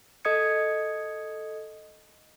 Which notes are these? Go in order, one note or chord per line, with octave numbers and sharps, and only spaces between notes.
A4 D#5 D#6 G#6 C#7